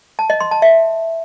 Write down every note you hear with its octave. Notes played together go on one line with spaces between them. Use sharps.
A5
D#5
C6
A5
E5